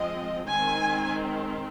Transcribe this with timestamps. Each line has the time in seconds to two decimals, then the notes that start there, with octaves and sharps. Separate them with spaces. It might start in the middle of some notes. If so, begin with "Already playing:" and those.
Already playing: F3 G#3 C4 D#5
0.46 D#3 G#3 C4 G#5